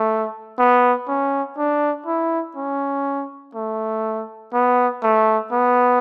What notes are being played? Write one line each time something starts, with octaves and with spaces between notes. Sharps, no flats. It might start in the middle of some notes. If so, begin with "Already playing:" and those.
Already playing: A3
B3
C#4
D4
E4
C#4
A3
B3
A3
B3